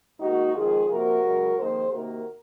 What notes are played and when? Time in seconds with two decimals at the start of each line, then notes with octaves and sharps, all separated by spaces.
0.20 G#2 D#3 A#3 D#4 F#4
0.54 F2 D#3 G#3 F4 G#4
0.89 C3 F3 A#3 F#4 A#4
1.23 F#2 C#3 G#3
1.57 F2 D#3 A#3 G#4 C5
1.92 C3 D#3 A#3 F#4 A#4